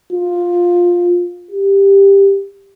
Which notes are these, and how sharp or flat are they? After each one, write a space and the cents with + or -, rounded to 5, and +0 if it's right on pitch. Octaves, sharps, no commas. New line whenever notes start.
F4 +10
G4 +10